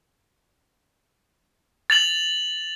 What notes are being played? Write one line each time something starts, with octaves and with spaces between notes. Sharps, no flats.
A6 F7 F#7